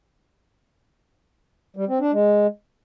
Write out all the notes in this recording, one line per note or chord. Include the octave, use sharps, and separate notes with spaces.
G3
C4
D4
G#3